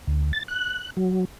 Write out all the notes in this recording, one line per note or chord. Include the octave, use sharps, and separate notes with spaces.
D2
A6
F#6
F#3